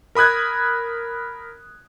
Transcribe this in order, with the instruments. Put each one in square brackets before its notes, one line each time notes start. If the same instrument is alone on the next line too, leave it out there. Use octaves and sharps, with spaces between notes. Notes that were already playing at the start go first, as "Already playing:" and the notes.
[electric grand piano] A#4 B5 D#6 F#6 G#6